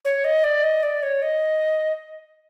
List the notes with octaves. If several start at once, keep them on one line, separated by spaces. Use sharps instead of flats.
C#5
D#5
D5
D#5
D5
C#5
D#5